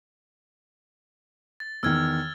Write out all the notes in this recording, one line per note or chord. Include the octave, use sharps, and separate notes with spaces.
A6
E2 D#3 E6 F6 G#6